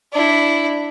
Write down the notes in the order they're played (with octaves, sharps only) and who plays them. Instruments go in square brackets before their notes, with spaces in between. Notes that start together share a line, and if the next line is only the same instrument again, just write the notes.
[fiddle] D4 E4